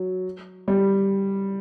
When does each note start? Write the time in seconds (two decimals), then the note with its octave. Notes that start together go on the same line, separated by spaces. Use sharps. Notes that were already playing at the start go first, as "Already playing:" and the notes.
Already playing: F#3
0.68 G3